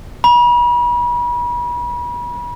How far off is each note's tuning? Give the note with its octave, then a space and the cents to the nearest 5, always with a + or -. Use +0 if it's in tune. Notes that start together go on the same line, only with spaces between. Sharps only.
B5 -40